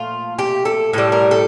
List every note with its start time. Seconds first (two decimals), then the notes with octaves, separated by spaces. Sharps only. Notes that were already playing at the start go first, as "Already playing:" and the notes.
Already playing: A#2 F3 A3 F4
0.39 G4
0.65 A4
0.93 A2 G3 A4
1.12 A#4
1.31 A4